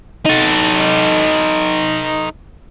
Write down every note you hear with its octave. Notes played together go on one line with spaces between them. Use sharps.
D#4 A4